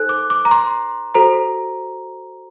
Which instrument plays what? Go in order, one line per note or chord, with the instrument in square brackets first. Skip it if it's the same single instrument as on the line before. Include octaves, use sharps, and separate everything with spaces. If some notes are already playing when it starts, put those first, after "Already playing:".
Already playing: [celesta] D#4 A4 C5 F#6
D6
D6
A#5
C6
F#4 A4 C5 A#5